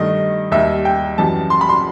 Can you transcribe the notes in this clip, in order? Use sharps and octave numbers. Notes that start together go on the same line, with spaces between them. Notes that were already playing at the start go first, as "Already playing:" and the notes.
Already playing: G2 D#3 A3 D#5
D#2 D#3 G3 E5
G5
F#2 E3 G3 A5
C6
B5
C6